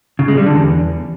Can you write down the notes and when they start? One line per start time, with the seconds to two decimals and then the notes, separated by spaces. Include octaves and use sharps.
0.19 C#3
0.28 G#3
0.37 G3
0.46 D3
0.56 E2